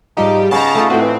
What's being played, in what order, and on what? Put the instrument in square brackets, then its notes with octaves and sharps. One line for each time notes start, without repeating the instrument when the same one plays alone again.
[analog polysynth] G#2 G3 G4 [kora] F3 [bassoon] D#4
[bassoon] C#3 [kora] B3 D#4 [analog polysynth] A5 A#5
[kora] A3 D#4 F4
[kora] A2 B4 [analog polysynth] C4 [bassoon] F#4
[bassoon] E3